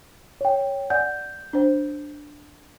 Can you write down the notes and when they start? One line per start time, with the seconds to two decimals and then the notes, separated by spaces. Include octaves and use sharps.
0.41 C#5 G5
0.90 D5 F#5 G#5 G6
1.53 D4 C5